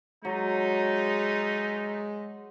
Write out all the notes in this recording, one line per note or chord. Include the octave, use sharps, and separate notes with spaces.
F#3 G#3 A3 D#4